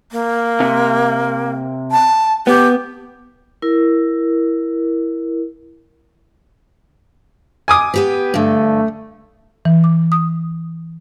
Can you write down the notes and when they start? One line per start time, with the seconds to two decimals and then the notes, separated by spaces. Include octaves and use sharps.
0.12 A#3
0.60 C3
1.92 A5
2.47 B3 G4
3.62 E4 A#4
7.68 G#5 D6 D#6
7.94 B3 G4 B4
8.34 G2 D3 A3
9.65 E3
9.84 D6
10.12 D#6